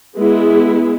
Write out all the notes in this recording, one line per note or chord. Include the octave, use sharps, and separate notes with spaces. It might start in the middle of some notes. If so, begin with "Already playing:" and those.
G#3 B3 E4 G#4